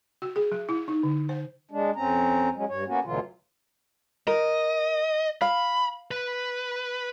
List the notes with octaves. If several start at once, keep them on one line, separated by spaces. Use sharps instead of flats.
F#4
G#4
F#3
E4
D#4
D3
C5
G#3 D4
F2 C4 C#4 A#5
F#3 G#3 C#4
G2 C#5
A#3 B3 C#4 F#4
D2 B2 D3 E3 F#3 F4
A#4 D#5
F5 B5
B4